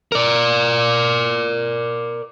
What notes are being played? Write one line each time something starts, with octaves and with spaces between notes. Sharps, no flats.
A#4 D5